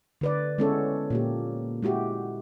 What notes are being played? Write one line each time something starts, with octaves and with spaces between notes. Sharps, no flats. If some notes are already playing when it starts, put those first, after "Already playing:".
D3 B4 D5
G#3 B3 C#4 E4 A4 C#5
A#2 A#3 G4
G#3 E4 F#4 G4